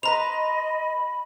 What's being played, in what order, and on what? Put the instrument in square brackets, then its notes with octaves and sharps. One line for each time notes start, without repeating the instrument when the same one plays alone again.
[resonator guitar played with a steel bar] B4 C5 [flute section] D#5 [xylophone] A#5 F7 [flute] B5